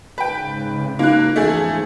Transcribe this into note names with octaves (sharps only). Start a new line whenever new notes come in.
G#2 C#3 B4 G5
A#3 C#4 D#4 F#6
E2 G#2 F3 A3 G#4